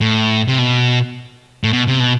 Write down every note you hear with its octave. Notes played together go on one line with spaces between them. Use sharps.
A2
C3
B2
A2
B2
C3
B2